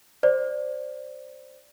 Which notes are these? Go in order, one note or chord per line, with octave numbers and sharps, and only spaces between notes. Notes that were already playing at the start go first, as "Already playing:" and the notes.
C5 D5